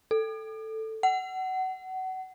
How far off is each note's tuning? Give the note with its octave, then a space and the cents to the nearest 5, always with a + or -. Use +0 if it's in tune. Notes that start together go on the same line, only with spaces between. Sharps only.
A4 +5
F#5 +25